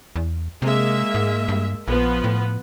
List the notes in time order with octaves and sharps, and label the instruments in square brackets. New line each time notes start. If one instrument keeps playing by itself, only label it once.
[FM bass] E2
[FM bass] C3 [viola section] G#3 A#3 E5
[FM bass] G#2
G2
[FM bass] A#1 [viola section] F3 B3 B4
[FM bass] A2